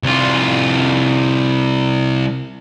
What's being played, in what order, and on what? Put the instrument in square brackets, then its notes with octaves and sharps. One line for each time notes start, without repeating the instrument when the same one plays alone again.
[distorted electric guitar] C2 F4